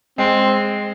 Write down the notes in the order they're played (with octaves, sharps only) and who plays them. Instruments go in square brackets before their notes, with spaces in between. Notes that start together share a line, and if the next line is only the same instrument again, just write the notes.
[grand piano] G#3 [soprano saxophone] C4